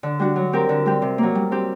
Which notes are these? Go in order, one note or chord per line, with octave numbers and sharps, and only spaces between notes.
D3
G3 D4 F#4
F#3
C4 G4 A#4
D3
G3 C4 G4
C3
F#3 A#3
G3
C4 G4